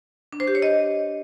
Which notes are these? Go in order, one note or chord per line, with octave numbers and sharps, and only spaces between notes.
D4
C5
G4
C#5
D#5